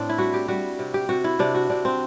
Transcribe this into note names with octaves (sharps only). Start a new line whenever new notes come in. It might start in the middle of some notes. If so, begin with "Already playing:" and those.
Already playing: A2 C4 D4
E4
G3 F#4
G4
G3 F#4
C3
G4
C3 F#4
E4
C3 D4
F#4
C3 D4
C4